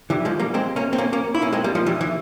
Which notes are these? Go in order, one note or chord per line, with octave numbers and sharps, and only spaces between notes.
E3 G3
F3 G#3
G3 A#3
G#3 C4
A#3 C#4
C4
A#3 C#4
A#3 C#4
E4
A#3 C#4
G#3 C4
G3 A#3
F3 G#3
E3 G3
E3